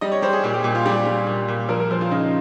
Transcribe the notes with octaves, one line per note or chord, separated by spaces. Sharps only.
G3 D#5
C#5
G3 C5
G#4
A#2 G4
G4
A#2
F4
G3 G4
G3
A#2
A#2
F3 A#4
A#4
F3 C5
F4
C#3 D#4